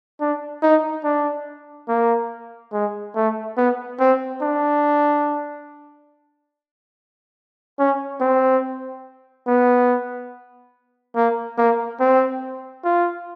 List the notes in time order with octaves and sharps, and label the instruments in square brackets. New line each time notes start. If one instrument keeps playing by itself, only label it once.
[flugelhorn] D4
D#4
D4
A#3
G#3
A3
B3
C4
D4
C#4
C4
B3
A#3
A#3
C4
F4